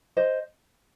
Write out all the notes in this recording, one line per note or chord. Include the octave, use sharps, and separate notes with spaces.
C5 D#5